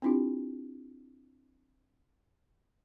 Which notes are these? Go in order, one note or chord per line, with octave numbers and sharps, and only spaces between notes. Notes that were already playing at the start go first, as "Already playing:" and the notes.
C4 D4 E4 F4 G4